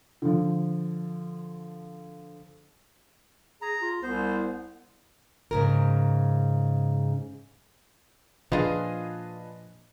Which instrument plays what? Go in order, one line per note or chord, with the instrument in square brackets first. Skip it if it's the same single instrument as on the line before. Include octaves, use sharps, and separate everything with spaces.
[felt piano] D3 F3
[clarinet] G#4 [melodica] A#5
[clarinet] F4
[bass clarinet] C2 [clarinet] B3 [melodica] C5
[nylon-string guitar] G#2 C#3 A#4
[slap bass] A#2 F3 [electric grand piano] D4 B4 D#5 [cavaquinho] F4 G#4